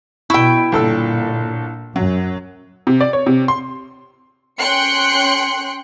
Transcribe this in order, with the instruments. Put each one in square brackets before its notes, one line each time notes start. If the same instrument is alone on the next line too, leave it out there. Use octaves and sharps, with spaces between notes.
[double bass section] B2 [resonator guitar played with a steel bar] E4 G5 [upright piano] C#6 E6
[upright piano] G1 A4 E6 [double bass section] A#2
[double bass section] F#2 [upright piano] F#3
[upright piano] C3
D5
C#5
C3
C6
[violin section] C#4 G5 C6 F#6 C#7